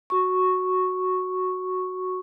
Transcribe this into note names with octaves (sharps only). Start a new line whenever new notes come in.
F#4 C#6